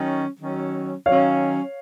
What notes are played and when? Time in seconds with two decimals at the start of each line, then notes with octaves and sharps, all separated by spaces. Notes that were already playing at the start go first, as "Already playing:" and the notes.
Already playing: D#3 F#3 C#4
0.40 D#3 F#3 C#4
1.06 D#3 F#3 C#4 C#5 F5